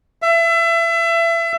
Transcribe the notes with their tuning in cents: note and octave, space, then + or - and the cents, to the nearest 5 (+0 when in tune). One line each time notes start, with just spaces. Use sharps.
E5 +30